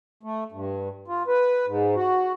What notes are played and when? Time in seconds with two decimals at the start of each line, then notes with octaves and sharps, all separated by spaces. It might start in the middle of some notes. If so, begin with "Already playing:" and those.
0.23 A3
0.52 G2
1.08 F4
1.27 B4
1.66 G#2
1.95 F#4